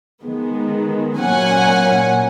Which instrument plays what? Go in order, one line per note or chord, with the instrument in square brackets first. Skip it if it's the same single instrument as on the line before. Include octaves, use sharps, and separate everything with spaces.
[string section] D#3 G#3 B3
A#2 F#3 A#3 C#4 F#5 G#5